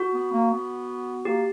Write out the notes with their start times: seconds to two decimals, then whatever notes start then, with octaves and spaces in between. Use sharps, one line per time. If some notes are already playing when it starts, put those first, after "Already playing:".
Already playing: F#4
0.14 B3
0.33 A#3
0.51 B3
1.25 A#3 G4